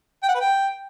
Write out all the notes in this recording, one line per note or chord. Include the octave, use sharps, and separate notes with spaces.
G5
F#5
B4
G5